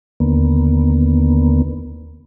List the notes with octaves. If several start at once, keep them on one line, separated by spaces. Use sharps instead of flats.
D#2 D3 A#3 B3